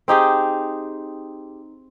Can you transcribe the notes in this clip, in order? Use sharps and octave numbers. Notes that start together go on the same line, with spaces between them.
C4 D#4 G4 G#4